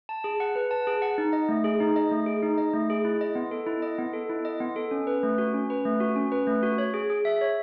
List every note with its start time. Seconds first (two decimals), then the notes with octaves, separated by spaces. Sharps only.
0.09 A5
0.24 G#4
0.40 F#5
0.56 B4
0.71 A5
0.87 G#4
1.02 F#5
1.18 D#4
1.33 D#5
1.49 A3
1.64 G#4
1.80 D#4
1.96 D#5
2.11 A3
2.26 G#4
2.43 D#4
2.58 D#5
2.74 A3
2.90 G#4
3.05 E4
3.21 D#5
3.35 B3
3.51 A4
3.67 E4
3.82 D#5
3.98 B3
4.13 A4
4.30 E4
4.45 D#5
4.60 B3
4.76 A4
4.91 C#4
5.07 B4
5.23 A3
5.38 F#4
5.54 C#4
5.70 B4
5.85 A3
6.00 F#4
6.16 C#4
6.32 B4
6.47 A3
6.63 F#4
6.78 C#5
6.94 G#4
7.10 G#4
7.25 E5
7.41 C#5